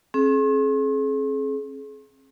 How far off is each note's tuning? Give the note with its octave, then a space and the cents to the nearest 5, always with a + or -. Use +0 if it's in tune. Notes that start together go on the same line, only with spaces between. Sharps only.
C4 +45 G#4 +40